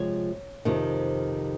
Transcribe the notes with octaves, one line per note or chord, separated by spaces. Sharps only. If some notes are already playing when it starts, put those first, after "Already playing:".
Already playing: C3 F3 G#3 C#5
F2 C3 D#3